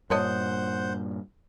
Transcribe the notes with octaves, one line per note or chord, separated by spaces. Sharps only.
G2 A#2 D4 C5 C#5 D#5 F#5 G6